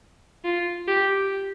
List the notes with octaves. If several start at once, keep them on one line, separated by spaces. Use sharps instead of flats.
F4
G4